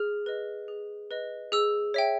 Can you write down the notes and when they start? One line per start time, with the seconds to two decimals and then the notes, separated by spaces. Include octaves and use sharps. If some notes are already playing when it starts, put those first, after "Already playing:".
Already playing: G#4 F6
0.26 B4 D#5
0.68 G#4
1.11 B4 D#5
1.52 G#4 E6
1.94 C#5 E5 G5